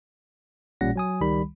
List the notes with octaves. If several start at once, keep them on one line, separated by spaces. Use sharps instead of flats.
A1 A#2 G3 C#4 F#5 A#6
F#3 G#5 D#6
C#2 D#3 G3 B5